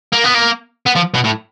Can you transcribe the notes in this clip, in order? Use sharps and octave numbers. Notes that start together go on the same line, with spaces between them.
A#3
B3
A#3
B3
F3
B2
A2